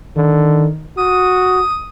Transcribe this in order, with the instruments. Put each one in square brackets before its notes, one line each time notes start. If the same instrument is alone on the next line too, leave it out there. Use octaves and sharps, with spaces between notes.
[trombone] D3 [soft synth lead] D#3
[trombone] F#4 [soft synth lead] D#6